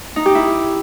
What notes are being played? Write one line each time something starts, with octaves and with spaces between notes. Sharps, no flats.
D#4
G4
E4